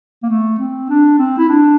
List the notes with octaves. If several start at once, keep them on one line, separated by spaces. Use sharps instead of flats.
A#3
A3
C4
D4
C4
E4
D4